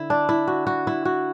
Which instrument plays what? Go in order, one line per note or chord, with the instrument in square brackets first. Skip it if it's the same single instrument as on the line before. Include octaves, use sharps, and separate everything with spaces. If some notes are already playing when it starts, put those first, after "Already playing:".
Already playing: [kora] D3 E4
D4
E4
F#4
F#4
E4
F#4